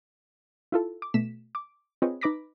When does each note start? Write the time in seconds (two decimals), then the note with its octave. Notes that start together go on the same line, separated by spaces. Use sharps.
0.72 E4 F4 A4
1.02 D6
1.14 B2 A3 B6 E7
1.55 D6
2.02 C4 F4 G#4 B4 C#5 D#5
2.21 D#4 B4 B5 D6 A#6 B6